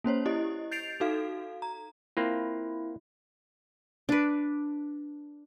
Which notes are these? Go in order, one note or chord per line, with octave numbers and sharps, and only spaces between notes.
A#3 C#4 C5 C#5
E4 G4 D#5
G6 A6 C7 D7 F7
D#4 F#4 A4 F5
A#5
A#3 C4 E4 F4
D4 B4